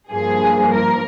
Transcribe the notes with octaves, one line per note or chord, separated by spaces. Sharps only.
G2 F3 A#3 G#4
A#4